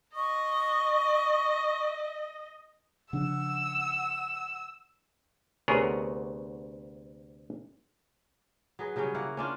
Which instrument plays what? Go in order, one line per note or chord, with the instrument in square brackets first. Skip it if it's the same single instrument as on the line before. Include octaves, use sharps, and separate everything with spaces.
[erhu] D#5 [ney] C#6
[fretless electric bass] C#3 F3 D4 [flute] F#5 [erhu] E6
[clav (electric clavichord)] D2 C3 B3 G#4 A#4 C#5
[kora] F#3 G#4 B4
C#3 F#3 G3 C#4
A#3 E4 F5 F#5
C#4 D4 F4